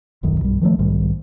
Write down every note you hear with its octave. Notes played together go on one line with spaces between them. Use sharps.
D#1 B1 F#2 D#3
B1 G2 G3
D#3 F3 G3 A3
B1 G#2 D#3 G3